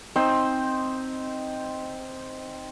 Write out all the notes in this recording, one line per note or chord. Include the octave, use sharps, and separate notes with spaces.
C4 D#4 C5